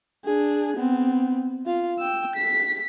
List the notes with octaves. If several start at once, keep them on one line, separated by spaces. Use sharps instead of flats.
D4 G#4
B3 C4
F4 F5
G5 E6
B6